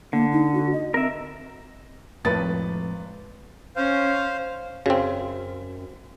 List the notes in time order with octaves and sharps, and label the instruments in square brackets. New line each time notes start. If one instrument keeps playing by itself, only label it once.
[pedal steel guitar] D3 [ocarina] A#3
[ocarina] D#4
F#4
D#5
[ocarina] C4 [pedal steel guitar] A#4 E5
[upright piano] G#1 B4 A6 [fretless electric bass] F2 A2
[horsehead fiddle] C#4 [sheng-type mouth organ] C5 F5
[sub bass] F#2 [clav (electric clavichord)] C#3 C4 [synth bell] F#4